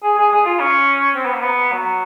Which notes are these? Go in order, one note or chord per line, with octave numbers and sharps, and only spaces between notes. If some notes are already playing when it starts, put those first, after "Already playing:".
G#4
G#4
G#4
F4
C#4
C4
B3
A#3
B3
F#3